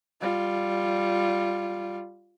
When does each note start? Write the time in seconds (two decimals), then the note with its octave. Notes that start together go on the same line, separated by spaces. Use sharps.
0.21 G3 F4